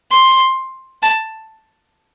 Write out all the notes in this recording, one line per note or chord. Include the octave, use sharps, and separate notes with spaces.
C6
A5